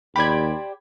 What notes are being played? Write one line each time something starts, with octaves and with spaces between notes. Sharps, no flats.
D#2 G4 C5 D5 B5 G#6